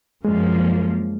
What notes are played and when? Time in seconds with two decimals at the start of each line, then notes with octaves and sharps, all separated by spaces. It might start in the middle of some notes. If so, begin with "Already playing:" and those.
0.25 F#2 F3 G#3 A#3